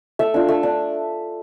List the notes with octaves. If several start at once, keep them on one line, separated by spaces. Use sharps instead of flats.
A3 E5
D4 F4
A3
D4